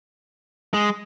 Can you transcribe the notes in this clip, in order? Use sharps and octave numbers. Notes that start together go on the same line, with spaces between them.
G#3